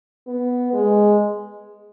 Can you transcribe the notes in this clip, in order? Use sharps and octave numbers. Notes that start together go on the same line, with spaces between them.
B3
G#3